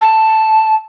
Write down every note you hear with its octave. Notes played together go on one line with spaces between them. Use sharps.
A5